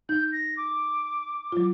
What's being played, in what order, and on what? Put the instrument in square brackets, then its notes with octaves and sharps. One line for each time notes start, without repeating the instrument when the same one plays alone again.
[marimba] D#4 [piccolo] G6
[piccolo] A#6
D6
[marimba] F#3 F4